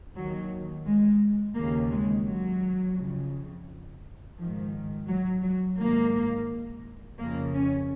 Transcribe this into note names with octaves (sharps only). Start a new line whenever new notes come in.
D#2 D#3 F#3
G#3
D#2 C#3 A#3
G#3
F#3
F2 C#3
G#2 D#3 F3
F#3
F#3
G#2 D#3 A#3
F2 C#3 A#3
C#4